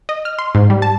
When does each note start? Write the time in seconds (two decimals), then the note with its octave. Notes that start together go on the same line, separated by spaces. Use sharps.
0.09 D#5
0.25 F6
0.39 C6
0.55 G#2
0.70 G3
0.82 A5